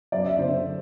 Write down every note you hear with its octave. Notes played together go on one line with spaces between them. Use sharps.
F#2 D5
E5
D3 C5
C5